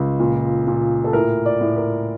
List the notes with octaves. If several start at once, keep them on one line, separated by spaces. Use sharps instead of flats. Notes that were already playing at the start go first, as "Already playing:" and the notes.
Already playing: C#2
A#2
A#2
A4
A2 A#4
D5
A2
A#4